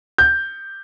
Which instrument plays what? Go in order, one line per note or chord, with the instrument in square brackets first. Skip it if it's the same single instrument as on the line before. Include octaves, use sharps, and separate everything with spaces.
[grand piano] G6